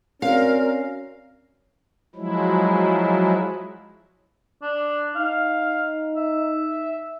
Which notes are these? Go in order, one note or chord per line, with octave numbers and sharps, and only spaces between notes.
C4 C#4 F#4 A#4 D5 F5
F3 F#3 G#3 E4
D4
D#4 F5
E5